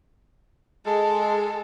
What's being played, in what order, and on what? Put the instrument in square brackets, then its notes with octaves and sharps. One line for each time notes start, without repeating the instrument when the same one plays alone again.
[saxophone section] G#3 [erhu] A4